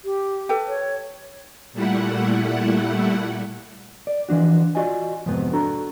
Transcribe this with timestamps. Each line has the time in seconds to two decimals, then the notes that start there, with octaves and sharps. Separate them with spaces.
0.05 G4
0.49 A4 B4 G5
0.67 C#5
1.73 A#2 G3 A3 E4 F#5
4.07 D5
4.29 E3 F3 D4 F#4
4.75 F4 F#4 D5 D#5 G#5
5.26 F2 G#2 C3 B3
5.53 D4 F#4 A4 A#5